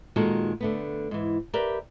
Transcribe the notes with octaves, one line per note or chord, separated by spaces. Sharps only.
A#2 D#3 G#3 D#4 F#4 A4
D3 A3 B3
G#2 E3
G4 A#4 B4 D5 E5